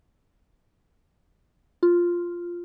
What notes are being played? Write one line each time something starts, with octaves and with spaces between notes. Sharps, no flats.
F4